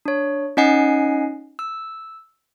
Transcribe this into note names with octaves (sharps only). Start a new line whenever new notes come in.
D4 C#5
C#4 D#4 D#5 F#5 G#5 C7
E6